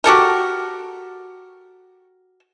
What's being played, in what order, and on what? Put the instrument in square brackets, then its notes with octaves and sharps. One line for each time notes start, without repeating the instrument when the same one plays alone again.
[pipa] F#4 G4 A4 A#4